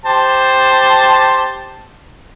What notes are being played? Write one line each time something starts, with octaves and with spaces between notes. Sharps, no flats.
G4 C5 A5